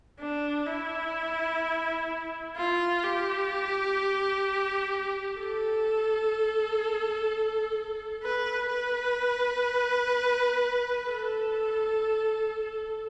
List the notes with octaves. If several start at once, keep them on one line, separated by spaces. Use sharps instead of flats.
D4
E4
F4
G4
A4
B4
B4
A4